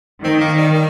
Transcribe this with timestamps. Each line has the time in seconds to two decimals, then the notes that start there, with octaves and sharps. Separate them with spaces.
0.24 D#3 C4
0.41 A#3
0.57 G3
0.74 G3